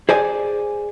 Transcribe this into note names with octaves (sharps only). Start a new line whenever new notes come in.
G#4 C5 D5 G#5